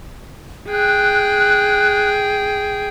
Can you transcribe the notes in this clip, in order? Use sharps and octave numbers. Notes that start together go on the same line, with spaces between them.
G#4 G5 F#6